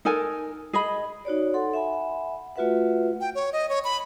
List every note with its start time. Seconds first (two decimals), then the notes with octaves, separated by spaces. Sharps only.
0.05 D#4 A4 A#4 G#5
0.73 G#4 D#5 B5
1.25 D#4 F#4 C#5 D5
1.54 A4 F#5 C6
1.74 E5 F#5 G#5 B5
2.56 A3 F4 F#4 B4 E5 F#5
3.21 G5
3.35 C#5
3.53 D#5
3.69 C#5
3.84 B5